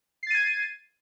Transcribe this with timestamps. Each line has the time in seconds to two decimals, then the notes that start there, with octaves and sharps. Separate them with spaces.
0.23 C7
0.27 A6
0.31 D#7
0.34 G#6